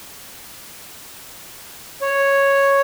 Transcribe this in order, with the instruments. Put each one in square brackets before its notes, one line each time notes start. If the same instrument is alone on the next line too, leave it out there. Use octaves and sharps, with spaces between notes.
[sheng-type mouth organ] C#5